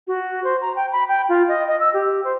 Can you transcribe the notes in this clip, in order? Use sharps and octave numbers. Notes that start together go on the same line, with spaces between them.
F#4
C5
A#5
G5
B5
G5
F4
D#5
D#5
E6
G4
C5